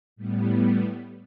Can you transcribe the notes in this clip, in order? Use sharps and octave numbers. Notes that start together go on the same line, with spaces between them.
A2 G3 B3